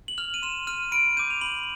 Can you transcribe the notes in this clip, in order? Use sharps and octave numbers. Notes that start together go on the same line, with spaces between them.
F#7
F6 F7
D#7
C6 E7
F6 D#7
B5 D7
D6 G6 D#7
F7
B5 F#7